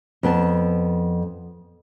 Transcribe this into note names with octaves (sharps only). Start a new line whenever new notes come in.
F2 B3 A5